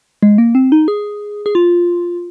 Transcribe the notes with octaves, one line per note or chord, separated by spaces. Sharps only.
G#3
A#3
C4
D#4
G#4
G#4
F4